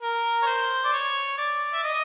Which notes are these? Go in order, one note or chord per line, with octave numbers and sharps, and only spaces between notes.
A#4
C#5
C5
D5
C#5
D5
E5
D#5